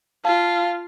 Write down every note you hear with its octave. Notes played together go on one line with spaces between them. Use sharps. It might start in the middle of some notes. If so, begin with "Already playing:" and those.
F4 F5 A5